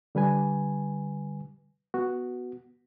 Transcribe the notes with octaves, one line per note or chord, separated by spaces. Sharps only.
D3 G3 B4 G#5
B3 F#4